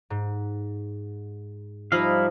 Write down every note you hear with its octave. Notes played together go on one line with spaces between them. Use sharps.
G#2
F3 G3 D#4 E4 D#5 F5 B5